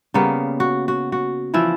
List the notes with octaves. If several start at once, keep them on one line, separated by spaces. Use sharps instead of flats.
C#3 G3 A#3 B3
F#4
F#4
F#4
E3 F3 E4